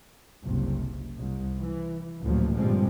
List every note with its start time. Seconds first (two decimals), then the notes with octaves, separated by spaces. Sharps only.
0.45 F#1 C2 C3
1.19 C2
1.60 E3
2.22 A1 D2 A#2 F3 F#3
2.57 G1 A#2 F3 G3 G#3 C4